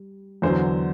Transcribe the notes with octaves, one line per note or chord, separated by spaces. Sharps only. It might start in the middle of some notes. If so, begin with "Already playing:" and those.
Already playing: G3
E2 D3 F#3 C5